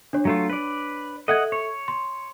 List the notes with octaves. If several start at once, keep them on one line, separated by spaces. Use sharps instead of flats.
D4 C#5
F#3 A3 F4
B4 D5
A4 D#5 E5 F#5 G#6
C#5
C6